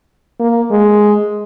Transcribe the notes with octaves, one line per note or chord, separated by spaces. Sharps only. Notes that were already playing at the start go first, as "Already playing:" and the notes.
A#3
G#3